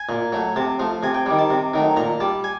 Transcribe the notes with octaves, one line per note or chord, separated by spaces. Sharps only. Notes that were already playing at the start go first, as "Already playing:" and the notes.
Already playing: G#5
A#2
F#3 A3
C3 A5
F3 A3
C3 G#5
G5
D#3 G3
A5
C3
D#3 F#3 A3
A#2 A#5
G3 A5
G#5